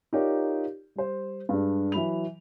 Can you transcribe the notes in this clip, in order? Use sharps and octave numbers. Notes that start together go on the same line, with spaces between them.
D#4 F4 G4 A#4 C#5 D5
G3 C5
G2 G#3 D4
E3 F#3 B5 F7